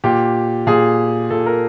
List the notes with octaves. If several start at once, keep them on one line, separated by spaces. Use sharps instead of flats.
A#2 G4
A#2 G#4
A#2 A4
A#4